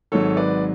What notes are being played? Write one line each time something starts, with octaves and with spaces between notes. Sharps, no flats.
G#1 G#2 F#3 A4 C#5
B4 D5